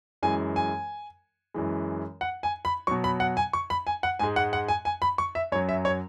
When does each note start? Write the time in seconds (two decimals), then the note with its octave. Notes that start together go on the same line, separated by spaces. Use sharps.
0.23 F#2 E3 G#3 G#5
0.56 G#5
1.54 F#2 E3 G#3
2.21 F#5
2.43 G#5
2.65 B5
2.87 B2 F#3 C#6
3.04 B5
3.20 F#5
3.37 G#5
3.53 C#6
3.70 B5
3.87 G#5
4.03 F#5
4.19 G#2 G#3 G#5
4.36 F#5
4.53 F#5
4.68 G#5
4.85 G#5
5.02 B5
5.18 C#6
5.35 E5
5.52 F#2 C#5
5.56 F#3
5.69 E5
5.85 C#5